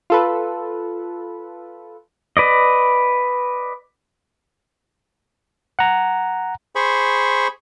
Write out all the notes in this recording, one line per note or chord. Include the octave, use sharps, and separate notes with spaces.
F4 A4 B4
B4 D5 D#5
F#5 A#5
G#4 C5 B5 C#6